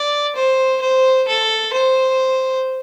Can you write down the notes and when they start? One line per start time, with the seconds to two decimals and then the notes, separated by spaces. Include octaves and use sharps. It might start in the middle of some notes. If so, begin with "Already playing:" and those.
Already playing: D5
0.36 C5
0.81 C5
1.27 A4
1.73 C5